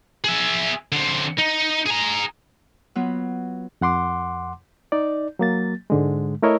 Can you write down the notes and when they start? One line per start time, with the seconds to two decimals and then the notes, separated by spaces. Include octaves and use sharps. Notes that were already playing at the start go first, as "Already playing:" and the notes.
0.24 G#4 E5
0.92 D3 C4
1.38 D#4
1.86 G#4 A#5
2.95 F#3 B3 F4 B4
3.81 F2 F#5 C6 D6
4.92 D#4 D5
5.39 F#3 A#3 A6
5.90 G#2 D3 G#3
6.42 A3 E4 A#4 C#5 D#5 E5